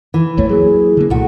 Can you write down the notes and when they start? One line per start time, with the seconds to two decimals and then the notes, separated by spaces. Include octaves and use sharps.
0.14 E3
0.37 G#1 D#2 A3 C#5
0.49 F#3 A#3 G#4
0.97 D3 A#3
1.10 C2 A#2 A3 F#4